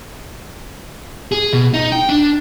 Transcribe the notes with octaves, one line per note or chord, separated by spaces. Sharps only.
G#4
B2
D#4
G5
D4